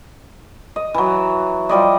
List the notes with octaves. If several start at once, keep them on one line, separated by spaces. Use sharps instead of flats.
D#5
E3 F#3
F3 G3 D5 D#5